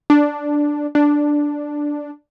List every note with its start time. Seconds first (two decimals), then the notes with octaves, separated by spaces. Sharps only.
0.10 D4
0.95 D4